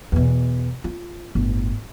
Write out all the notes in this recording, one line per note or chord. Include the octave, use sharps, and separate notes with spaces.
E2 B2
F4
G1 A2